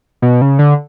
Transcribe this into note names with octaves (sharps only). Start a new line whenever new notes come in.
B2
C#3
D3